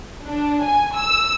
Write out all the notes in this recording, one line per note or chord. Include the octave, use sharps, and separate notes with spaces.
D4
G#5
E6